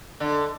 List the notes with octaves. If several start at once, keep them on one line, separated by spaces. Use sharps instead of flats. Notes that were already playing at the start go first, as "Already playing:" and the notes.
D3